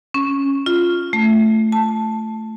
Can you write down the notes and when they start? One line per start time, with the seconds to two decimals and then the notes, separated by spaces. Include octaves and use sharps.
0.14 C#4
0.66 F4
1.13 A3
1.72 A5